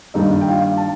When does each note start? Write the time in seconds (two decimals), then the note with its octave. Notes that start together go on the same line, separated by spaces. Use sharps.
0.14 G2 D#3 G3 A#3 D4 D#4 D#5
0.41 G5
0.48 F4 F5
0.77 A5